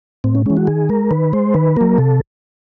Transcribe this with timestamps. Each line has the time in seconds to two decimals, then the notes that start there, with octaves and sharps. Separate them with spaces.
0.24 A2 C4
0.35 C#4
0.46 E3 G#3 C#4
0.57 F#4
0.67 D#3 G#4
0.89 G#3 A#4
1.11 D#3 B4
1.33 G#3 C5
1.54 D#3 B4
1.76 F#3 A#3 A#4
1.98 C3 A4